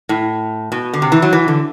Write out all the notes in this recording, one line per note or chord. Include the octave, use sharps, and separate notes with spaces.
A2
B2
D3
C3
E3
F#3
E3
D3